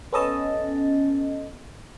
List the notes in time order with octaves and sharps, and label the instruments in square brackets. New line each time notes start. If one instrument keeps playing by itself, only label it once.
[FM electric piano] B3 C#4 A4 D#5 A5